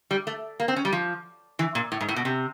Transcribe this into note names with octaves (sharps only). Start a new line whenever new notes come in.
G3
A3
A#3
C4
C#4
G3
F3
E3
A#2
A2
G#2
A2
B2
C3